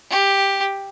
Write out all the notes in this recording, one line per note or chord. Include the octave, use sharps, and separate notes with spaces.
G4